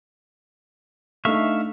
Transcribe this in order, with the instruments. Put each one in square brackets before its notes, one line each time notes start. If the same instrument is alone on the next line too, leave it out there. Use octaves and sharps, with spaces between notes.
[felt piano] A3 D4 D#4 [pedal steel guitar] E5 F5 C#6